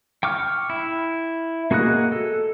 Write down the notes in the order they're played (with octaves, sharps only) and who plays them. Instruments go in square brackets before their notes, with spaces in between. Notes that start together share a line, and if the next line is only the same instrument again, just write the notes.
[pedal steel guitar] G5 C#6 D6 F6
E4
A#3 F#4 G#4 D#5 F#6
A4